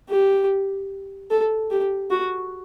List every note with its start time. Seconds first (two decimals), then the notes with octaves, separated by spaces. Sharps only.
0.09 G4
1.30 A4
1.71 G4
2.10 F#4